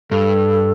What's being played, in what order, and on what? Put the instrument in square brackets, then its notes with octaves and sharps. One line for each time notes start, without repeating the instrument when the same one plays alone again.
[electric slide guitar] G2 [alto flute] A4